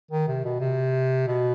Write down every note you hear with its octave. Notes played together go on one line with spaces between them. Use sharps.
D#3
C3
B2
C3
B2